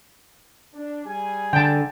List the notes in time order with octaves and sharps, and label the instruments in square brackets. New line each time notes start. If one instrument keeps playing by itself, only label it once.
[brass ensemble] D4
G3 G#4 G#5
[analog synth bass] D3 [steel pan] G5 A5